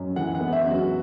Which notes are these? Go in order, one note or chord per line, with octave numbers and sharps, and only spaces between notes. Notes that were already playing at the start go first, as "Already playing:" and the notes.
Already playing: F#2
E3 F#5
F#5
B3
E5
F#2
F#4